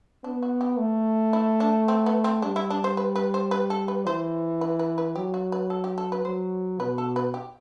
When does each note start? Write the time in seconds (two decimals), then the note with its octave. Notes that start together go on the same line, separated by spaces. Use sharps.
0.24 B3 D4
0.42 F#4
0.61 G4
0.78 A3
1.33 E4
1.60 D4
1.88 C4
2.06 B3
2.24 C4
2.42 G3 D4
2.56 E4
2.70 D4
2.84 C5
2.97 B4
3.16 B4
3.34 C5
3.51 B4
3.70 A4
3.88 B4
4.06 E3 C5
4.61 B4
4.79 B4
4.98 B4
5.15 F#3 G4
5.34 F#4
5.52 B4
5.70 A4
5.84 G4
5.98 A4
6.12 B4
6.25 F#3 C5
6.80 B2 B4
6.98 A4
7.16 B4
7.34 G4